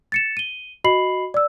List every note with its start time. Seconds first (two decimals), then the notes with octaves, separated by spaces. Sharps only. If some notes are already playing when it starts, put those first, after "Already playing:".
0.12 A6 C#7 E7
0.37 D#7 G7
0.84 F#4 D#5 B5 C7 F#7
1.34 D5 E6